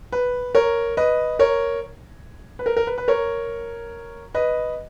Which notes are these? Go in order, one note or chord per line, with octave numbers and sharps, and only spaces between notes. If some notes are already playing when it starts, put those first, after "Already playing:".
B4
A#4 C#5
B4 D#5
A#4 C#5
B4
A#4
A#4
B4
B4
A#4 C#5
B4 D#5